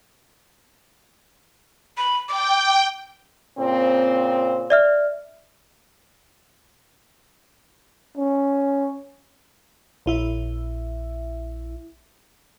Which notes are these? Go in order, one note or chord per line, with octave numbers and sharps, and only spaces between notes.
B5
G5 D6
A#2 C#3 C4
D5 E5 F6
C#4
A#1 E4 E5